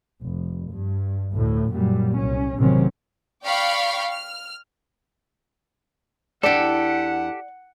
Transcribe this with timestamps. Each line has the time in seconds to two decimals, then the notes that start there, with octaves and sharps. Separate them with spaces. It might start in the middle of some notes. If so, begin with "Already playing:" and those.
0.23 F1
0.72 G2
1.33 D2 A2
1.72 F#2 A#2 F#3 G3
2.18 C2 C#4
2.58 A1 C3 D#3 F#3 C4 C#4
3.44 D5 F5 G5 B5 C#6 F6
4.09 F6
6.43 E2 D4 G4 A4 D5 F#5